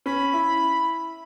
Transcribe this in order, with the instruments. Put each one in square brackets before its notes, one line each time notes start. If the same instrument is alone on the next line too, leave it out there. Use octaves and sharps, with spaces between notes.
[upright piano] C#4 [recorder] B5
[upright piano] E4